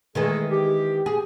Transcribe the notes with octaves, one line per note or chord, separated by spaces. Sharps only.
D#3 E3 G#3 A3 G#4 A4
G4
G#4